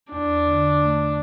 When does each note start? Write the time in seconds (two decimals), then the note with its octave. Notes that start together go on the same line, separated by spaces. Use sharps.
0.12 E2 D4
0.47 D3
0.82 A3